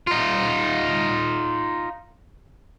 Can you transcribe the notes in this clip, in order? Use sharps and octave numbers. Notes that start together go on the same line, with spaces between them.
D#4 F4